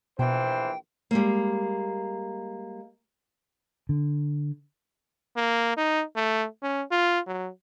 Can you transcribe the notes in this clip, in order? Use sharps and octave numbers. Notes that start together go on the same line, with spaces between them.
A#1 B2 E3 C5 G5
G3 G#3 A#3
D3
A#3
D#4
A3
C#4
F4
F#3